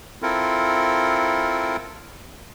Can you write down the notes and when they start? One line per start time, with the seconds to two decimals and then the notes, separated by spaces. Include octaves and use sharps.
0.22 C4 E4 F4 A4 A#4